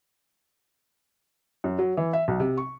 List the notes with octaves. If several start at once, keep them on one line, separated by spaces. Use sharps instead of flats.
F#2
F#3
E3
E5
B1
C3
C#6